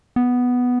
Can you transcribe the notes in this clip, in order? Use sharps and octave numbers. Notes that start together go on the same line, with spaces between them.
B3